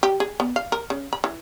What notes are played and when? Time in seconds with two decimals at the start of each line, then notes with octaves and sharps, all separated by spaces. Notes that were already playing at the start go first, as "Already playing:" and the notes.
0.03 G4
0.20 G#4
0.40 B3
0.56 F5
0.72 A#4
0.90 C#3
1.13 B5
1.24 E3